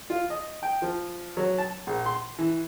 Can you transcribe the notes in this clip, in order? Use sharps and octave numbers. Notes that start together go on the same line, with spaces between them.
F4
D#5
G5
F3
F#3
A5
A#1
C6
E3